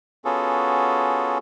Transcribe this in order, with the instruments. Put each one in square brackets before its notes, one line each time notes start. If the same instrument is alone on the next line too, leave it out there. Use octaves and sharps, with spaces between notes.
[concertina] B3 C#4 F4 F#4 G#4 A4